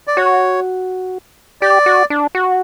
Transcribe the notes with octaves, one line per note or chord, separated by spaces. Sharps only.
D5
F#4 C#5
G4 D5
F#4
D4
F#4